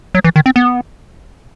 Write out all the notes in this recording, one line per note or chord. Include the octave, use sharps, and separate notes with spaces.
F#3
E3
D#3
C4
B3